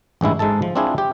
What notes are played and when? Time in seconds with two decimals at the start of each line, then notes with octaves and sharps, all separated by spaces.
0.21 A1 G2 G#3 E4
0.39 G#2 G#3 D#4 A4 A5
0.62 F3
0.75 C4 D4 E4 F4 G#4
0.98 G4